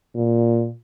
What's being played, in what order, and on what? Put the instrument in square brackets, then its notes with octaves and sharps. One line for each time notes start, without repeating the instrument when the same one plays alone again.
[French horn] A#2